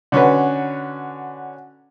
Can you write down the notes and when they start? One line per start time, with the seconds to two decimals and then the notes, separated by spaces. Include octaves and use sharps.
0.12 D3 C#4 F#4 B4